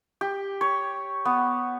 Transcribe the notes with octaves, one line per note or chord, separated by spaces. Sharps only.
G4
C#5
B3